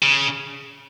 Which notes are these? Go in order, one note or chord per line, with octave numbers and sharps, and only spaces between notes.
C#3